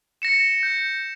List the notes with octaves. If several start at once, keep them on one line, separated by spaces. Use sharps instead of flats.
A#6 C#7 E7
G6